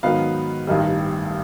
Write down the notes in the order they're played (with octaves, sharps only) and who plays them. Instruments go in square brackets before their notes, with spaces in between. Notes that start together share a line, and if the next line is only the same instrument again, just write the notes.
[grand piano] G#2 D#3 F#3 B3 F5
A1 G2 D#3 G3